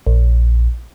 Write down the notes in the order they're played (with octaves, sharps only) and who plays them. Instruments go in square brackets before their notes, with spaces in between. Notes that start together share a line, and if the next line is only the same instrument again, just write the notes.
[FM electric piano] A#1